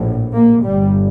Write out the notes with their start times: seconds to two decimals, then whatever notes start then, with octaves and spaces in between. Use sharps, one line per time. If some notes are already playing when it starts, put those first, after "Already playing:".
Already playing: A#1 A2
0.33 A#3
0.64 G1 G2 G3